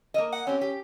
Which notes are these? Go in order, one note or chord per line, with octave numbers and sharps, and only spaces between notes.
A#3 D#5
F#5
C4 C#4 G4
G4